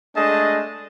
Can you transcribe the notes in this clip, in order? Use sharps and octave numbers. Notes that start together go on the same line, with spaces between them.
G#3 A3 D4 G#4 D#5 A5